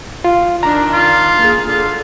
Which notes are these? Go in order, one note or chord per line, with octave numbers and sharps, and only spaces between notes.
F4
D#3 D4 A#5
F4
A#3 G#4
D3 F4